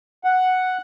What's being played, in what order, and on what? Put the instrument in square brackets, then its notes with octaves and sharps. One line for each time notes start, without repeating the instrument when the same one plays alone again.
[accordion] F#5